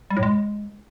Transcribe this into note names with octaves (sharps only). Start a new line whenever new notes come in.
G3
A2
G#3